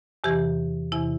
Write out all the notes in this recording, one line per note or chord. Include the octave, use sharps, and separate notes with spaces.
E2 C3 E3 G4
E2 C3 E3 E4